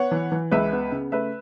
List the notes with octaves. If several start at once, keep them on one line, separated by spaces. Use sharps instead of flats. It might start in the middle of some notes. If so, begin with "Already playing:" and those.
Already playing: B3 C#5 F#5
E3
E3
C#2 B4 E5
B3
C#3
A3 B4 E5